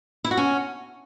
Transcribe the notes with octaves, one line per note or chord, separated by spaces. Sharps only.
E4
F#4
C#4